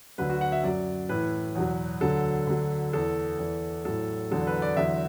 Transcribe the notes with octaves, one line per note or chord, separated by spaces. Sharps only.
D2 D3 F#3 B4
F#4
F#5
E5
F#2 F#3 D5
A2 E3 B4
E2 B2 F#3
D2 D3 F#3 A4
D2 D3 F#3
E2 E3 A4
E2 E3
A2 F#3 A4
E2 D3 F#3 A4
B4
D5
E2 D3 F#3 E5